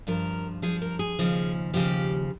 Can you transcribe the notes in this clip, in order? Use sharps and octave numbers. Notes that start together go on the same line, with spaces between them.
G2 F3 A#4
G2 F3 G#4
A#4
G#4
D#2 C#3 F3
D#2 C#3 F3 G4